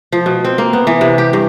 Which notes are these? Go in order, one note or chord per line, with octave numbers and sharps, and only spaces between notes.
F3
B2
C4
A#3
B3
E3
C3
G4
G2